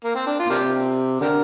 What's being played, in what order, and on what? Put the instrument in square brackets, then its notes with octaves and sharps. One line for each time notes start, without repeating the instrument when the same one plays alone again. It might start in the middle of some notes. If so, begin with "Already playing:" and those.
[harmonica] A#3
C4
D4
F4
[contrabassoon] A#2
[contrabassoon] C3 [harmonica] A#3 D4 G4
[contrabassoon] D3 [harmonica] D4 G4 A#4